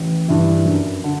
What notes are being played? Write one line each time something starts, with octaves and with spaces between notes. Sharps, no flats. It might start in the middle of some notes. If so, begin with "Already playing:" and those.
Already playing: A1
G2 E3
F#2
D3